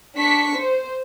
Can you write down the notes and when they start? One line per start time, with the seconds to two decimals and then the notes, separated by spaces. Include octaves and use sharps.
0.17 D4 C#6 B6
0.57 C5